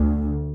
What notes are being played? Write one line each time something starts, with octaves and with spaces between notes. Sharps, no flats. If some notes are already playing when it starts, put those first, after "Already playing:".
Already playing: D2